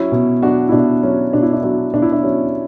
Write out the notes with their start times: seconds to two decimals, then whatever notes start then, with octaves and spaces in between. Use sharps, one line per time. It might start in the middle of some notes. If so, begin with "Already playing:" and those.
Already playing: F#3 C#4 E4
0.12 B2
0.42 F#3 D4 F#4
0.69 E4
0.72 B2 D4
1.03 F#3 C#4
1.33 B2 D4
1.43 E4
1.53 D4
1.63 F#3 D4
1.93 B2 D4
2.02 E4
2.12 D4
2.23 F#3 C#4